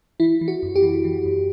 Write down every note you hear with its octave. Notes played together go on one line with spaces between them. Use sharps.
E3 E4
E3
F#4
F#2
G4
E3
E3
F#2